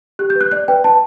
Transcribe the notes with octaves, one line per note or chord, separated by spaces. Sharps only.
G4 F#6
G6
B4
F#6
D5 F#6
B4 G5
B4 A5